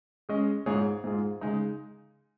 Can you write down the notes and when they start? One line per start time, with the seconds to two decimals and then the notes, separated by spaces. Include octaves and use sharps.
0.29 G#3 C#4 G#4 D#5
0.66 G#2 G#3 F4 G#4 C#5
1.04 G#2 G#3 F4 G#4
1.41 C#3 G#3 D#4